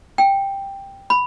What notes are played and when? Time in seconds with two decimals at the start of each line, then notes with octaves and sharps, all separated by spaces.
0.18 G5
1.10 B5